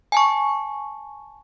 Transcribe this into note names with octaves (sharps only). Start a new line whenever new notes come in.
G#5 A5 C#6